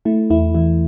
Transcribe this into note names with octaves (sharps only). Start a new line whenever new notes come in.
A3 E4
E2 E4
E3 E4